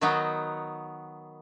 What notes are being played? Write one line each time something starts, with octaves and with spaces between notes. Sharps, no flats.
D#3 F#3 B3 D#4 F#4